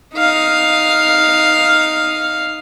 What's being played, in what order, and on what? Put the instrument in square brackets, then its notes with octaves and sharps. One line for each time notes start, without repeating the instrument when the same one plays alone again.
[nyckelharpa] D#4 F5